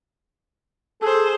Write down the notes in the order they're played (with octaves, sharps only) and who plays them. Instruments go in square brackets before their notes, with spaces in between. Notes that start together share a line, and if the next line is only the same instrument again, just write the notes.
[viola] G#4 C5 [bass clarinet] A4